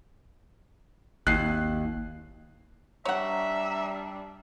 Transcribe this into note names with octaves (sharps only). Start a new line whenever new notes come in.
G#1 D#2 F#6 C7
G3 D4 C#5 E5 F#5 A#5